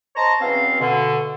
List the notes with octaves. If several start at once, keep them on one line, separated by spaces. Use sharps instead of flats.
C5 C#5 D#5 A5 A#5
E2 B2 C4 C#4 F5
B2 D3